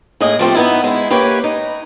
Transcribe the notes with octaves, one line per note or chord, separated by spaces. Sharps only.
A2 A#3 G#4 D#5
F3 A3 C4 G4
B3 D#4 E4
G#3 E4
A#3 G4 B4 C#5
D#4